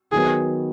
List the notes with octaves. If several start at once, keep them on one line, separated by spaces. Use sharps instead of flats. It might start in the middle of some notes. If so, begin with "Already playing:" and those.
D#3 F#3 B3 G#4